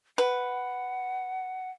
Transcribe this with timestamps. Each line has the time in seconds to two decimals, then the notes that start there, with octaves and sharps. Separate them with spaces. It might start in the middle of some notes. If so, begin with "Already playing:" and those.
0.18 B4 F#5